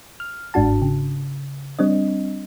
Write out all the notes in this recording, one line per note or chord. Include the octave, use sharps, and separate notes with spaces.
F6
G1 G#2 D4 F#4 A5
C#3
G3 C4 D4 D#5